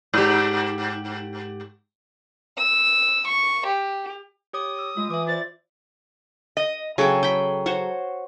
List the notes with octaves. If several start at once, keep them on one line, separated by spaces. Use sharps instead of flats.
G#2 G4
E6
C#6
G4
G4 C#5 D6 D#6
E6
G#3 F4
E3 E5 D6
F4 C5 D5 A6
D#5
C#3 F#3 G#4 A4 G5
G5 B5
F#4 C5 C#5